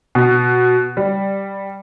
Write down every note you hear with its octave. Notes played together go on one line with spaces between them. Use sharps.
B2
G3